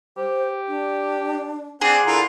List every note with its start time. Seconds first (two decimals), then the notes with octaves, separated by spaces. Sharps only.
0.17 G4 C5
0.68 D4
1.81 C4 D4 G#4 F#5 G#5
2.06 D3 E4 F4 A#4